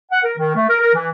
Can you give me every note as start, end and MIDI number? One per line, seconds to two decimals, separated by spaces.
0.11 0.19 78
0.24 0.33 70
0.38 0.56 51
0.56 0.66 57
0.69 0.77 70
0.81 0.93 70
0.95 1.10 52